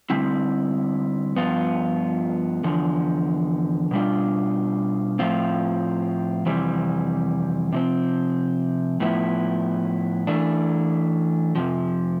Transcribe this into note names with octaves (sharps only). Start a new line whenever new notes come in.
D3 G3 C4 E4
G2 F3 B3 F4
E2 D3 F3
B2 G3 D4 F4
A2 F3 C4 F4
F2 C3 E3 G3 C4
C3 F3 C4
A2 F3 B3 E4
E3 A3 D4
F2 C3 F3